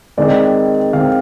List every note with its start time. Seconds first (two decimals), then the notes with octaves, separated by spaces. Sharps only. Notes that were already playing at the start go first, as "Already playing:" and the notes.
0.17 D#3 G#3 C4 D5
0.93 D#3 G#3 C4 F5